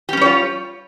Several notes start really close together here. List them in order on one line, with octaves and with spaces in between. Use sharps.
G4 C#4 G3 C#5 F4